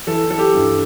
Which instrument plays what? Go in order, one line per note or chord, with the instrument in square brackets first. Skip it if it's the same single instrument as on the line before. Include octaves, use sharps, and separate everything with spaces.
[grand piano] E3 A4
E3 A4
G4
G2